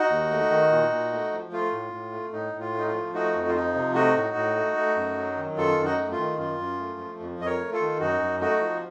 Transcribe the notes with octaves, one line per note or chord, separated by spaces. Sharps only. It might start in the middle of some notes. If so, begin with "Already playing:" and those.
Already playing: D#4 F#4
D#2
A3
D#3
A#2
A#2
A3
F3
A3 F4
A2
A2
A3
A2 D#4
A2
F4
A3
D#4
F4
F3
A3 D#4 F#4
F2
F4
F3 D#4
C3
A3 D#4 F#4
A2
A2
A3
A3
F#2
F#3
D#3
F#2 F4 A4
F#2
D#4 F#4
A3
F4
D#3
F#2 F4
F#2
A3
F3
F2
F2 D#5
A#4 C#5
A3
F4 A4
D#3
F#2 D#4 F#4
F#2
A3 D#4 F#4
F3